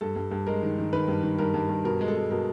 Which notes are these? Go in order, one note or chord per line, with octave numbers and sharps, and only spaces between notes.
G2 A4
G2
G2
G#3 A#4
D#3
D#3
D#3 B4
G2
D#3
G2 A#4
G2
G2
B2 A#4
G#3
A4
G#3
B2 A#4